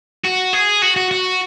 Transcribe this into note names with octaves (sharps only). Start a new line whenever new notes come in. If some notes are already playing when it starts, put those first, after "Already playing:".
F#4
G#4
F#4
F#4
F#4